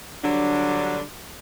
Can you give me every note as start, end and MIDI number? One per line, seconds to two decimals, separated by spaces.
0.23 1.02 50
0.23 1.02 54
0.23 1.02 55
0.23 1.02 62